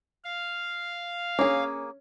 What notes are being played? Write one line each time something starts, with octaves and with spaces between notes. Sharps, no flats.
F5
A#3 C#4 G#4 C#5